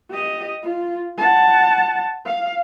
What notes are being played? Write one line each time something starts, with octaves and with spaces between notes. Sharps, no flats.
G4 D#5
F4
F#5 A5
F5